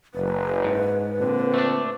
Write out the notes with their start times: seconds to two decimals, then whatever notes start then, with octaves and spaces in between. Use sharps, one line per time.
0.14 F#1 B4
0.64 G#2
1.20 A#2 D3 C4
1.54 A3 D4